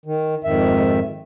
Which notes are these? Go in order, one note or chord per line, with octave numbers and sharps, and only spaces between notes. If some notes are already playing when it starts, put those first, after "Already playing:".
D#3
F2 G#2 D#3 E5